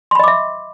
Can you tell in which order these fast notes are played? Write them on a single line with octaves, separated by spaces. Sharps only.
C6 B5 D#5 D6 E5